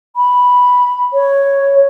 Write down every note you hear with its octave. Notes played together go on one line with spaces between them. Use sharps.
B5
C#5